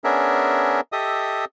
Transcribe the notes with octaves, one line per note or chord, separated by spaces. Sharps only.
B3 C#4 D4 G#4 A#4 E5
G4 A4 D#5 E5 D#6